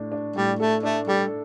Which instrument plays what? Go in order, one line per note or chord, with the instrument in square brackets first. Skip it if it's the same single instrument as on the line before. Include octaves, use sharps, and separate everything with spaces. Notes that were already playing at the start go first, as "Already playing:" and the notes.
Already playing: [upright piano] A2 D4
D4
[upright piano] A2 [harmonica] G3
[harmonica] A3 [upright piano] A4
[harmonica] A3 [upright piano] D4
[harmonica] G3 [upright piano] A4